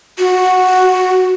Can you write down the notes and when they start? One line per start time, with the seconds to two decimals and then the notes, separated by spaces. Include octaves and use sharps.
0.19 F#4